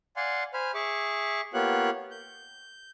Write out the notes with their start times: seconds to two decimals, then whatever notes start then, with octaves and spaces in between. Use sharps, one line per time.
0.16 D5 F5 F#5 G#5 C6
0.54 C5 G#5 B5 F6
0.74 G#4 E5 C#6 D6
1.54 A#3 B3 F4 G4 C#5 F#6
2.11 G6